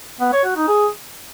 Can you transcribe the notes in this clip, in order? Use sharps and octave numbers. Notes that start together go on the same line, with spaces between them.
B3
C#5
F#4
D#4
G#4